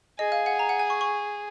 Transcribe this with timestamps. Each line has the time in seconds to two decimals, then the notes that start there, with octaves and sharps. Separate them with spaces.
0.19 G#4 D#5
0.32 F5
0.46 F#5
0.59 A#5
0.69 F#5
0.79 G#5
0.90 C#6
1.01 C#6